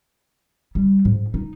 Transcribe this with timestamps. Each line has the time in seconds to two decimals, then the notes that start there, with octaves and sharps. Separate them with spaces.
0.75 G3
1.05 G#2
1.34 D#4